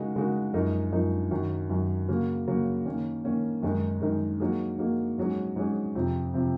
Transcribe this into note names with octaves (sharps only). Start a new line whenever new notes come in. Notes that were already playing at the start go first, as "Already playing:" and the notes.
Already playing: C#3 G#3 D#4 F#4 A#4
C#3 G#3 D#4 F#4 A#4
F#2 F3 G#3 D#4 A#4
F#2 F3 G#3 D#4 A#4
F#2 D#3 F#3
F#2 D#3 F#3
C#3 F#3 A#3
C#3 F#3 A#3
D#3 A#3 C#4
D#3 A#3 C#4
F#2 D#3 G#3 D#4 A#4
F#2 D#3 G#3 D#4 A#4
F#3 A#3 D#4 G#4
F#3 A#3 D#4 G#4
G#2 F#3 C#4 G#4
G#2 F#3 C#4 G#4
F2 C3 F3 C4
C3 F3 C4